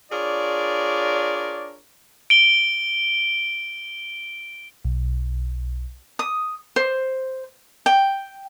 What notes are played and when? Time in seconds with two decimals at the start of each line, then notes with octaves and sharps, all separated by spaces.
0.11 D4 F4 G#4 A#4 C#5 D5
2.30 D7 G7
4.85 B1
6.19 D#6
6.76 C5
7.86 G5